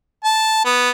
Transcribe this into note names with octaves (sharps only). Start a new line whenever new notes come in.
A5
B3